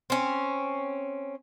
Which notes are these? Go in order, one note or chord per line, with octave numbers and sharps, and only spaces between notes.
C4 C#4